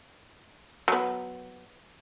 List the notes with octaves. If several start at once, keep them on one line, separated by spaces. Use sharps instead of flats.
F#3 B3